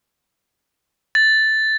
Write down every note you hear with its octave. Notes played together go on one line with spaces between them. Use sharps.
A6